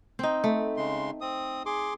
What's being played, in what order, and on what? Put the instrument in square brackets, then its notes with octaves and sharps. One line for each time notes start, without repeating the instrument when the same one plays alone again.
[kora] C4 D#4
A3
[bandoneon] C#3 G#3 C6
C4 D#6
G#4 C6 D6